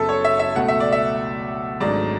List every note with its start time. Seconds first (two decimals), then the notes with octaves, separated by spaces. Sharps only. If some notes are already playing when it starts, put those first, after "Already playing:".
Already playing: F#1 F#2 C#3 F#3 B3 A4 E5
0.09 C#5
0.25 E5
0.39 E5
0.55 C#2 B2 A3 F#5
0.68 E5
0.80 D5
0.92 E5
1.80 G#1 G#2 F#3 A3 D4 D5